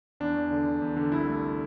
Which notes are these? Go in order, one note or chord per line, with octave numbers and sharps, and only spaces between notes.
E2 D4
E2
D3
D3
E2
D3
C2 E4
A3